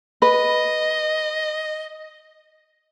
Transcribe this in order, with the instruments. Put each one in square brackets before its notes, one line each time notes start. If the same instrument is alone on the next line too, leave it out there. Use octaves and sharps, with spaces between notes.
[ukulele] B4 [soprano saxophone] D#5